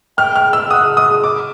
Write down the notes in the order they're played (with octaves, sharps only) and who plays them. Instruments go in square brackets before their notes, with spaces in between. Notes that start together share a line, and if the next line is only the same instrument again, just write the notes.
[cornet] G5 [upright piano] F6
[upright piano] F6
E6
[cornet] F#5 [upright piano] D#6
[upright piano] D#6
D6